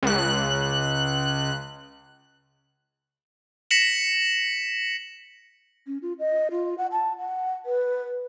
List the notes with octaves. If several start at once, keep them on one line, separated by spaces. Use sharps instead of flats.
C#2 F#6
A#6 B6 C#7 E7 F#7
C#4
F4
D#5
F4
F#5
A5
F#5
B4